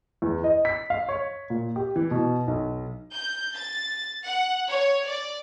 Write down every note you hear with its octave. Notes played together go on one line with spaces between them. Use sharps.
E2
D#5
B6
F5
C#5
A#2
G4
E3
B2
B1
G6
A6
F#5
C#5
D5